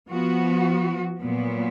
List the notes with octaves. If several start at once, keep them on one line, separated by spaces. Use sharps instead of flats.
F3 B3 F#4
A#2 F#3 B3